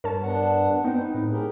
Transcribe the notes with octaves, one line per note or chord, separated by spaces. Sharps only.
G2 A#4 C#5 A5
B3 D4 F#5
G2 B3 C4 D#4 G5
B4
A2
G4 G#4 A#4